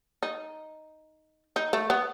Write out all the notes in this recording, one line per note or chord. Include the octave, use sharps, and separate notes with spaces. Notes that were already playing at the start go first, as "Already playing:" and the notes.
D#4
D#4
A3
B3